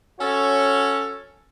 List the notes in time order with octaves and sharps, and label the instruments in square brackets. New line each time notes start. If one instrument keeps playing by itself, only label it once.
[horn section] C#4 F#4 A4 C#5